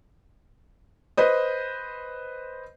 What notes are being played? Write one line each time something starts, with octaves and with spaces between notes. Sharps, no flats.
B4 C5 D#5